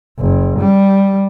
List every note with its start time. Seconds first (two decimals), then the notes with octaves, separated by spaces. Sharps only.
0.20 F#1
0.59 G3